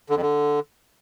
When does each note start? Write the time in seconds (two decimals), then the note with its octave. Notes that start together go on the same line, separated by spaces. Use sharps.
0.10 D3
0.16 F2
0.22 D3